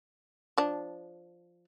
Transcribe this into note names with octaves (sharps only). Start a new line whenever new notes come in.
F3 D4